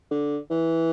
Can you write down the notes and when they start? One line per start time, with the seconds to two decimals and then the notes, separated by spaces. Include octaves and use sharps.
0.11 D3
0.51 E3